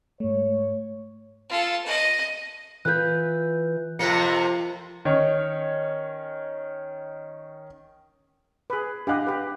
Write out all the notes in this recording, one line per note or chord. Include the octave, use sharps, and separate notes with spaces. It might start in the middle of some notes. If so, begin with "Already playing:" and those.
G#2 A3 C#5
F4 A4
D#5
E3 F4 B4 F#6 G6
F2 C3 F3 A#3 C#7
D#3 C#4 C#5
G#4 B4
D4 G4 D#5 F5 F#5 D6 F#6
G4 B4